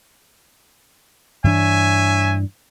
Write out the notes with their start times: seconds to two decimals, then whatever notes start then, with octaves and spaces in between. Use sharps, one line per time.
1.44 G2 E3 D4 C#5 E5 G#5